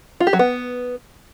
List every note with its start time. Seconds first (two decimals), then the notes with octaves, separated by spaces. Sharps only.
0.20 F4
0.27 G4
0.33 F#3
0.39 B3